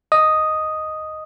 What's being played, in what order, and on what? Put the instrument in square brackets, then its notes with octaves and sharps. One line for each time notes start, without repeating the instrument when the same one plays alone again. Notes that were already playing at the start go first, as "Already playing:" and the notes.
[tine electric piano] D#5 D#6